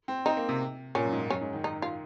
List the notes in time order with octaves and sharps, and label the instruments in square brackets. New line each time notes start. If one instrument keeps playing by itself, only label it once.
[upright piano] C4
[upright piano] C4 [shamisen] D#4
[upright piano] A#3
C3
[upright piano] A#2 [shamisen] C#4
[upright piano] F#2
G#2
[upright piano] F#2 [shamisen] C#4
[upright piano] G#2
D#3
[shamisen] D#4
F4